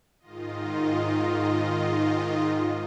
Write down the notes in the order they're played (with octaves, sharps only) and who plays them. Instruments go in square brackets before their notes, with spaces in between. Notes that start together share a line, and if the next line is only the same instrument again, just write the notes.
[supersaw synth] G#2 D#3 F4 D#5